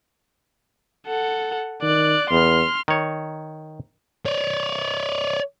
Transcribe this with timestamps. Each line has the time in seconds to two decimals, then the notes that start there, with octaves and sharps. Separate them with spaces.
1.06 A4 F#5
1.82 D#3 D5 F#6
2.30 E2 C6 F6
2.88 D#3 C#5
4.26 C#5 D5